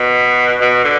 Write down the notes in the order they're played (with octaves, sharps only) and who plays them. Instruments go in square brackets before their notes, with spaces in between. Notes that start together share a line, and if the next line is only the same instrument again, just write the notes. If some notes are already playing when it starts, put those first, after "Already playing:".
Already playing: [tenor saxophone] B2
B2
D3